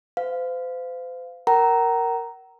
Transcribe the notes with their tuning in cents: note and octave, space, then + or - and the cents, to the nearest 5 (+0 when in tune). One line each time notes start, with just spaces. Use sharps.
C5 -40 F5 +0
A#4 +0 F#5 +45 A#5 +0